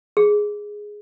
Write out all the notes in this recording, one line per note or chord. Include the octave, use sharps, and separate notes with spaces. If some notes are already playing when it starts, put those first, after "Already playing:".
G#4